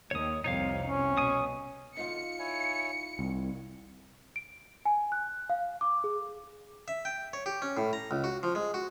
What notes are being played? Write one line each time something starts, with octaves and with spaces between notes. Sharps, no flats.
D#2 C#5 D#6
C2 F2 C3 D#4 C#5 F5
C#4
B2 G#5 D#6
B2 D3 D#4 F4 F5 C#7
E4 C#5 G#5
C2 D#3
D7
G#5
F#6
F5
D6
G#4
E5
G5
C#5
G4
C#4
A2
A#5
C#2
F#4
F3
G#3
F#4